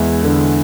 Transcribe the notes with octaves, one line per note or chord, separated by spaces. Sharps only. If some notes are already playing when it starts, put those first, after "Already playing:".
Already playing: E2 G#3 E4
D3